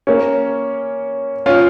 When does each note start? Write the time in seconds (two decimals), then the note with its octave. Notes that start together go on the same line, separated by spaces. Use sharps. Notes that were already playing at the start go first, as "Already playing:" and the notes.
0.07 A#3 C#4
1.46 C#4 F4